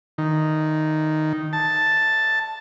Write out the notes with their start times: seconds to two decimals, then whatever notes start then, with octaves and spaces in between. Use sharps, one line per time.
0.18 D#3
1.53 A5